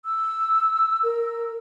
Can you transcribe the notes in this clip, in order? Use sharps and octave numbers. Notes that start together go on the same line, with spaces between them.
E6
A#4